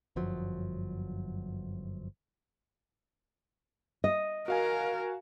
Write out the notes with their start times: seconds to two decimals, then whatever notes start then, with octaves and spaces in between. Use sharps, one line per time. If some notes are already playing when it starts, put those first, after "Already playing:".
0.16 G1 F#2 F3 F#3
4.04 D#5
4.48 F#4 A#4 F5 G#5